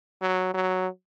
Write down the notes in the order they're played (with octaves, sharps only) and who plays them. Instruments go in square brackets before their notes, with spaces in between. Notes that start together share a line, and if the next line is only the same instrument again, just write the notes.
[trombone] F#3
F#3